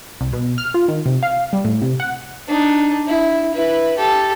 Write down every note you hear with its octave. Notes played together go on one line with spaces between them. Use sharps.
C2
B2
F6
F4
D#3
C3
F5
G3
A2
C3
F#5
D4 D#4
E4
E4 B4
G4 A4